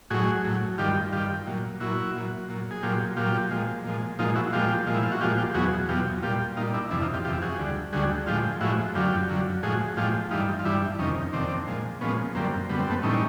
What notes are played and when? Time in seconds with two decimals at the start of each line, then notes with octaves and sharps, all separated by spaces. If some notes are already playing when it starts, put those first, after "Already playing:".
0.10 A2 F#3 F#4 G#4
0.45 A2 F#3
0.78 G2 D#3 G3 F4 G4
1.12 G2 D#3 G3 F4 G4
1.47 A#2 F#3
1.80 A#2 F#3 E4 F#4
2.15 A#2 F#3
2.49 A#2 F#3
2.71 G#4
2.83 A#2 F#3 F4 G4
3.17 A#2 F#3 F4 G4
3.51 A#2 F3 G#3
3.85 A#2 F3 G#3
4.19 A#2 F3 G#3 D#4 F4
4.36 E4 F#4
4.53 A#2 F3 G#3 F4 G4
4.87 A#2 F3 G#3
4.94 E4
5.04 F4
5.12 F#4
5.21 A#2 F3 G#3 F4 G4
5.38 F4 G4
5.54 E2 B2 F#3 F#4 G#4
5.89 E2 B2 F#3 F4 G4
6.23 A#2 G3 F4 G4
6.57 A#2 D#4 F4
6.61 G3
6.74 D4 E4
6.91 F2 C3 E3 D4 E4
7.02 D#4 F4
7.14 F4 G4
7.25 F2 C3 E3 F4 G4
7.42 F#4 G#4
7.59 D2 D3 G3
7.93 D2 D3 G3 F#4 G#4
8.26 A2 F3 G#3 F4 G4
8.61 A2 F3 G#3 E4 F#4
8.95 F#2 D3 F#3 F4 G4
9.29 F#2 D3 F#3
9.63 A2 F3 G#3 F#4 G#4
9.97 A2 F3 G#3 F4 G4
10.31 G2 E3 G3 D#4 F4
10.59 F4
10.65 G2 E3 G3 D4 E4
10.99 F2 C3 D#3 C#4 D#4
11.33 F2 C3 D#3 C4 D4
11.67 A#2 F3 G#3
12.01 A#2 F3 G#3 B3 C#4
12.35 F#2 D3 G3 A#3 C4
12.69 F#2 D3 G3 B3
12.79 C4
12.90 A3 B3
13.03 A2 E3 G3 C#4 D#4